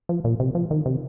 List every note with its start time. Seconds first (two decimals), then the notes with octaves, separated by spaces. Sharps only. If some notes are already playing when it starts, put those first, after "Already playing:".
0.09 F3
0.24 A#2
0.40 C3
0.55 F3
0.71 D#3
0.86 C3